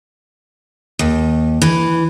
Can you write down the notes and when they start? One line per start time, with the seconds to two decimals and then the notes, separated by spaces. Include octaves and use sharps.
0.99 D#2
1.62 E3